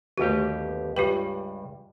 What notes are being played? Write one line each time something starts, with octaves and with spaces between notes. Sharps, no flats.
G1 D#2 A3 F#4 G4
C#2 G2 F4 G4 B4